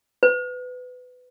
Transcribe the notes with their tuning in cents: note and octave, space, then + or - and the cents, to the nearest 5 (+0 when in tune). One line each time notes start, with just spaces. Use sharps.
B4 +20